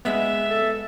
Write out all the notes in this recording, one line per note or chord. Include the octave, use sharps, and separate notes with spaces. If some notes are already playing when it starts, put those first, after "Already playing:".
G#3 B3 E5
A4